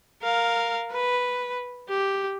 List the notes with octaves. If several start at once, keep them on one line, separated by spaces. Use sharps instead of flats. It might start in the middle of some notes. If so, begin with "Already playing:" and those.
A#4 F5
B4
G4